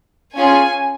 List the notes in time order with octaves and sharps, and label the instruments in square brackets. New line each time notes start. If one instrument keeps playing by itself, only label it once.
[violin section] C#4 F4 G#4 G#5